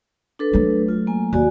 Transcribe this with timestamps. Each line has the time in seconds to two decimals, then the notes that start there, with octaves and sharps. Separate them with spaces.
0.39 D4 A4 B4
0.53 F#3 A3
0.88 F4
1.07 A#3 G#5
1.33 D#2 F#4 D5 G#5